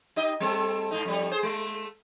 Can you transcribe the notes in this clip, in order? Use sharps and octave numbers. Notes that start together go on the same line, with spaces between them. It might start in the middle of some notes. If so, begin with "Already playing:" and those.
D#4 G4 D#5
G3 C4 A4
G#2 D#4
F2 A2 G3
G#4 C5
G#3 A3